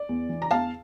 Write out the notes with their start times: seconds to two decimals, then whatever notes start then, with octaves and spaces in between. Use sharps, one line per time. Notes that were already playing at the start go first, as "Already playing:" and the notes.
Already playing: D5
0.09 E2
0.29 E3
0.42 A#5
0.51 E2 F5 A5